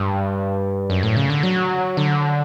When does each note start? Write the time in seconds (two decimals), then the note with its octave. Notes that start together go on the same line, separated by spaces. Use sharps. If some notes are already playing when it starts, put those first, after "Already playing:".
Already playing: G2
0.90 F#2
1.03 A2
1.17 C#3
1.30 D3
1.43 F#3
1.97 D3